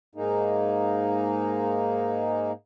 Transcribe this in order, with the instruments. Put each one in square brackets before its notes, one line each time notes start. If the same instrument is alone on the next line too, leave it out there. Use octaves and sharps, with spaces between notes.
[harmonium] G#2 G#3 A#3 D#4